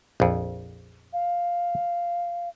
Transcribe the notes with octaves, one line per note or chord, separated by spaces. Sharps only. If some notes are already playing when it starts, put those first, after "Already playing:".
A#1 F2
F5